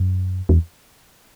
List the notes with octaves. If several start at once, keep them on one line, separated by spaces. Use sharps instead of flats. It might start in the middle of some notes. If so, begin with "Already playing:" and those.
Already playing: F#2
E2